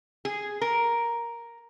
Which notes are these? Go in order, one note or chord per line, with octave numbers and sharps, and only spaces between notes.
G#4
A#4